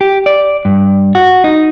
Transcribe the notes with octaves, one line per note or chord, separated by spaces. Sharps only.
G4
D5
G2
F#4
D#4